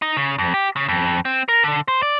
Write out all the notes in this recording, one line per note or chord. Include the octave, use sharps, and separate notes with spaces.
D#4
C#3
F2
G4
C#3
F2
C4
A#4
D3
C5
D5